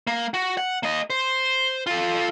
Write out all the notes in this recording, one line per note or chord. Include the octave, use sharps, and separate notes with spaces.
A#3
F#4
F#5
A#3 D#5
C5
F4 A4